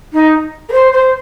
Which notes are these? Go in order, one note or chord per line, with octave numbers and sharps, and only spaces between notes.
D#4
A#4
C5
C5